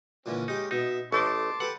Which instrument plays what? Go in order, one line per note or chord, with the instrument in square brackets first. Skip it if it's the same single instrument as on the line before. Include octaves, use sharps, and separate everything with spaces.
[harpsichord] A#2 D3 E3 [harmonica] C#4
[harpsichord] G#3 G4 [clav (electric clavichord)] D#4
[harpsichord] B2 [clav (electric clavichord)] D#4 [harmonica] E5
[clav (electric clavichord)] A1 A3 [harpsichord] A4 D#5 [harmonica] A5 C6 D6
[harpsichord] G4 A4 B4 [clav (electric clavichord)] F#5